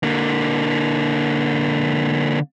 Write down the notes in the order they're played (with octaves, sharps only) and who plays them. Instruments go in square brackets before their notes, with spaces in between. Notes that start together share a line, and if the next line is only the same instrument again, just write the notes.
[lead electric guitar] D3 A#3